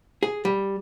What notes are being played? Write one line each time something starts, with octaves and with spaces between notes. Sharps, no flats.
G#4
G3